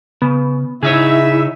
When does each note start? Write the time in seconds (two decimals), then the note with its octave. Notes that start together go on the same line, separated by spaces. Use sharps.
0.22 C#3 B3
0.83 C#3 D#4 E4 G#4 C#5 E5